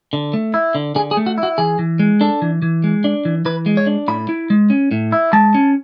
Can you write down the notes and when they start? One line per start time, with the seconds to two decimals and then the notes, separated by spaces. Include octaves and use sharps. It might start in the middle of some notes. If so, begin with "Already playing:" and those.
0.13 D3
0.34 A3
0.54 E4
0.75 D3
0.95 D3 G#4
1.11 G#4
1.17 A3
1.26 F#4
1.38 E4
1.43 F#4
1.58 E3 G#4
1.79 E3
1.99 G#3
2.21 D4 A4
2.42 E3
2.62 E3
2.84 G#3
3.04 D4
3.25 E3
3.45 E3 B4
3.66 G#3
3.77 C#5
3.87 D4
4.08 A2 B5
4.29 E4
4.50 G#3
4.70 C#4
4.91 A2
5.12 E4
5.33 G#3 A5
5.54 C#4